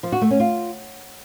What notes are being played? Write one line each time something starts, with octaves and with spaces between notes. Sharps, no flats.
F3
F#4
A3
C#4
F4